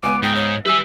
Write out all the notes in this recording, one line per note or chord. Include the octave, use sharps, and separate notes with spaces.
C#2 B3 G#5 D6
G#2 D#4 G5
C#5
G3 B4 E5 G#5 E6